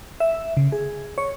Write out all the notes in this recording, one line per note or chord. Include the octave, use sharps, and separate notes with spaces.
E5
C#3
G#4
C#5